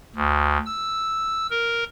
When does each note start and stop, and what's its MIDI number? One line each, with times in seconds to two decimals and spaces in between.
0.16 0.58 38
0.66 1.47 88
1.50 1.84 70